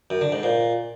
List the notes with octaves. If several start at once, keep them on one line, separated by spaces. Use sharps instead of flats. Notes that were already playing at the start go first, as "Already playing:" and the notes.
F#2
D3
G#2
A#2